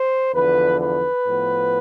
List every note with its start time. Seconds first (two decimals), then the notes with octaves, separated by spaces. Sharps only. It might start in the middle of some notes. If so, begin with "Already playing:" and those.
Already playing: C5
0.34 E2 D3 F3 B4
0.80 B4
1.25 A2 F3 B3